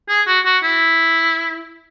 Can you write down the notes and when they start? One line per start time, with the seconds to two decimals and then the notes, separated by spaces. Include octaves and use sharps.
0.09 G#4
0.27 F#4
0.45 F#4
0.63 E4